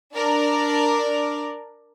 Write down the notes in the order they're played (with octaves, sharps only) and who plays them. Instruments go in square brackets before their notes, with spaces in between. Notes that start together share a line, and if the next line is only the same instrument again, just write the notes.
[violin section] D4 A#4 D5